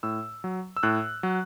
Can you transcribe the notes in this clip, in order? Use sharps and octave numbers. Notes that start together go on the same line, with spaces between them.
A2 E6
F#3
E6
A2 F#6
F#3